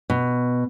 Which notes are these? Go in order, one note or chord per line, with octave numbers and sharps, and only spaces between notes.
B2